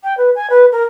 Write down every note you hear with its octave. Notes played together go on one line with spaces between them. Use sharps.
G5
B4
G#5
B4
A#4